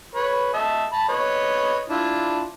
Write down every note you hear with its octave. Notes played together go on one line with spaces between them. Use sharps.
B4 C#5
D#5 E5 A5
A5 B5
B4 C#5 D#5
D4 E4 F4